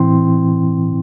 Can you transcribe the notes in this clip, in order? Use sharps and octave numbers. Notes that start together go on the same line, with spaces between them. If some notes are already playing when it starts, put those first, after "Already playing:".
Already playing: A2 E3 C4 E4 G5 C6